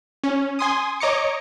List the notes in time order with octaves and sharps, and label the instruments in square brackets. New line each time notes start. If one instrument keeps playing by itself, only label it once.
[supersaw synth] C#4
G#5 C6 D#6
C#5 D#5 A#5 D6 C#7